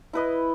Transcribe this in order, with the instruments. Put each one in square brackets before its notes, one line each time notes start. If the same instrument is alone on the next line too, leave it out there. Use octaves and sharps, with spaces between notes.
[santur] E4 B4 D#5